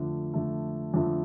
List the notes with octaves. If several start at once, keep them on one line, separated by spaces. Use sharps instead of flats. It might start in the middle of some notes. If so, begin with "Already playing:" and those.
Already playing: F2 D3 A3
F2 D3 A3
F2 D3 A3